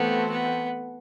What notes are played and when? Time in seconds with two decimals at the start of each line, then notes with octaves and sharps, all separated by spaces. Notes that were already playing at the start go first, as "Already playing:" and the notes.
Already playing: E3 A3 B3 C4 F#4 A4
0.31 B3